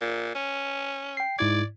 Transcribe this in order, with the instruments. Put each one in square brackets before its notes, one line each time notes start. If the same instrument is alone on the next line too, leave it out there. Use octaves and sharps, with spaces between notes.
[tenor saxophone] A#2
C#4
[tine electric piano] G5 C7
[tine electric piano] G#2 E4 G#6 [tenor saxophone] D5